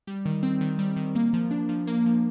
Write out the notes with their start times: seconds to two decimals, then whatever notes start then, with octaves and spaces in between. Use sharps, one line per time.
0.07 G3
0.26 D#3
0.43 C4
0.61 D#3
0.79 G3
0.97 D#3
1.15 A#3
1.33 F3
1.51 D4
1.69 F3
1.87 A#3
2.06 F3